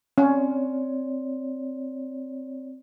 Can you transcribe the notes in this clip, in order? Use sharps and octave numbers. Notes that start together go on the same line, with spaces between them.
C4 C#4 C#5 D5